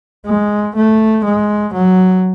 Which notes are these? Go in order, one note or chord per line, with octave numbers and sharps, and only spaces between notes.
G#3
A3
G#3
F#3